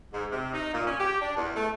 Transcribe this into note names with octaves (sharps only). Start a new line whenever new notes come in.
G#2
C3
D#4
A#2
C#4
G4
D4
E2
A3